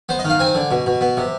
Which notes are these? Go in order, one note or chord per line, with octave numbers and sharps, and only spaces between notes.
B3 C5
D#5
D#3
F5
C4 G#5
D3
B2
B2
B3
C3